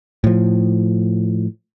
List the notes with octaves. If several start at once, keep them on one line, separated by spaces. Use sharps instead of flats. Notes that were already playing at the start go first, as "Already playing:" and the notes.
A2 F3